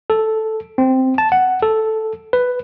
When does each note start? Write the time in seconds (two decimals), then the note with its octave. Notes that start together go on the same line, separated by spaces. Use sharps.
0.10 A4
0.78 C4
1.18 A5
1.32 F#5
1.62 A4
2.33 B4